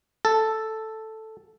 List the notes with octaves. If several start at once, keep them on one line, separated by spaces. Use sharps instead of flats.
A4